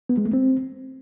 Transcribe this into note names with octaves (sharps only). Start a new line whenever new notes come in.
B3
G#3
A3
C4